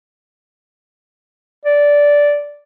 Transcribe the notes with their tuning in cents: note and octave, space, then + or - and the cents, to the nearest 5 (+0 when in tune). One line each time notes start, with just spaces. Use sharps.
D5 -10